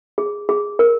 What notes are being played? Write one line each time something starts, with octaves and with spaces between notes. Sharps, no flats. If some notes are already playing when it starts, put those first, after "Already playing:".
G#4
G#4
A#4